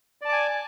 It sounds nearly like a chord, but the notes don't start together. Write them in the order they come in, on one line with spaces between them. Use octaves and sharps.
D5 A5 D6 G#5